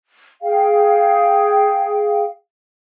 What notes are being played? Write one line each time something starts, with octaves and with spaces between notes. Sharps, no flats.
G#4 F5 G5